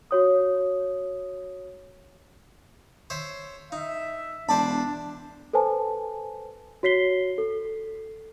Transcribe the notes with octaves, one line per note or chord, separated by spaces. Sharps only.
F#4 C#5 D#6
C5 C#5 E5
D#4 E5
E1 D4 C5 D5 A5 B5
A4 B4 C5 G#5 A5
F#4 C#5 B6 C7 G7
A4